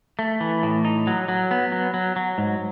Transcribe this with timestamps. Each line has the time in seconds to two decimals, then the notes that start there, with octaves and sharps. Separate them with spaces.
0.19 A3
0.40 E3
0.63 A2
0.85 D#4
1.07 F#3
1.29 F#3
1.51 B3
1.72 F#3
1.94 F#3
2.16 F#3
2.38 G#2